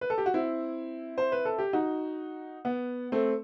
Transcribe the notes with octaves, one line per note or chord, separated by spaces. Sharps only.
B4
A4
G4
F#4
C4 E4
C5
B4
A4
G4
D#4 F#4
B3
A3 C4